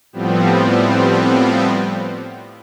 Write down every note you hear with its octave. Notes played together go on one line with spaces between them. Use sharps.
A2 F3 G3 B3 C4